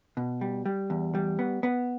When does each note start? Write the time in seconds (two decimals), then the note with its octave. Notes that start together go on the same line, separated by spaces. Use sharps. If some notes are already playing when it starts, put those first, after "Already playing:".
0.17 B2
0.41 G3
0.66 G3
0.90 E2
1.15 G3
1.39 B3
1.63 B3